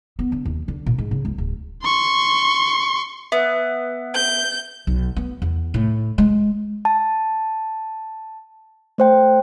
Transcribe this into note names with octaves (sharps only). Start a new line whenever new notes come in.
B3
D3
D#2
D3
A#2
G#2
C#3
C#2
D1
C6 C#6
B3 E5
G6
B1
B3
E2
A2
G#3
A5
A3 C5 G5